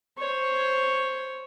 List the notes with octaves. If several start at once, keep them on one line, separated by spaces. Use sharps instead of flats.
C5 C#5